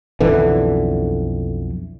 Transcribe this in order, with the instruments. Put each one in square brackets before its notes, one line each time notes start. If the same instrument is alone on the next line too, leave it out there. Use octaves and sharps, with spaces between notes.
[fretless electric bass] B1 F2 D3 E3